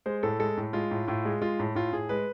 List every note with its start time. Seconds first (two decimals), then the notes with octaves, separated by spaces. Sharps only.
0.06 G#3 C5
0.23 A2 A4
0.39 G#3 A4
0.57 A2
0.73 G#3 F4
0.91 A2
1.07 A2 F4
1.25 G#3
1.41 G#3 F4
1.59 A2
1.75 A2 F4
1.92 A2 G#4
2.09 G#3 B4